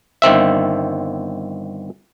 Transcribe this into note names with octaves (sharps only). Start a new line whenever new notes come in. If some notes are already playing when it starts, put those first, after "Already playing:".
G1 D#3 C4 E5